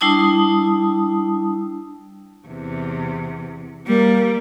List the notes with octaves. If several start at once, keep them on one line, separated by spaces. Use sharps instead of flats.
G3 D4 E4 A5 D#6
E2 C3
G3 A#3